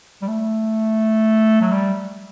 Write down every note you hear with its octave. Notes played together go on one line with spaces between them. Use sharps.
G3
A3
F#3
G3